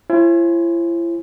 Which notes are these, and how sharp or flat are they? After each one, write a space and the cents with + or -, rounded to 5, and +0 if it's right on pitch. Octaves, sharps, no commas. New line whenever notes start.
E4 +45 C5 +45 G#5 +0